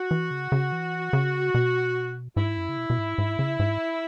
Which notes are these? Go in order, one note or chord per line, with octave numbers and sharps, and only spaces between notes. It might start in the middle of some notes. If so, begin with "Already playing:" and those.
Already playing: F#4
E3
C#3
C#3
E3
C#3
B2
G#2 E4
F#2
C#3
B2
B2
G#2
G#2
C#3
G#2